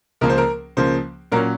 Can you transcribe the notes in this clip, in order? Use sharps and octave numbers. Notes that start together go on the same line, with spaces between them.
C#2 C#3 F3 A#3 A#4
C5
A#4
C#2 C#3 F3 A#3 C5
A#2 F#3 C#4 A#4